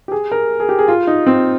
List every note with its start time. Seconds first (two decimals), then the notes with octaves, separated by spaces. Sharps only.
0.08 G4
0.12 G#4
0.32 A#4
0.60 G#4
0.69 G4
0.79 G#4
0.88 F4
1.07 D#4
1.27 C4